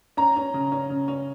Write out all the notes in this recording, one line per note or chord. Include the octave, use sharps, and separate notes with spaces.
C#4 A#5
C#4
C#3
C#4
C#3
C#4